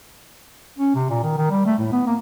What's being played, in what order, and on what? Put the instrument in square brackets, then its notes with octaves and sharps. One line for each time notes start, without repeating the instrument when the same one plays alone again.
[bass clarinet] C#4
C3
A#2
D#3
D#3
G3
A3
A2
B3
A#3